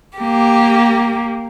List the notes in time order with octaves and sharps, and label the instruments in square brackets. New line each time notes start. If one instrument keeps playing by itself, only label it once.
[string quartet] A#3 G4